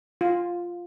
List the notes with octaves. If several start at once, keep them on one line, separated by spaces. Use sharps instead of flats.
F4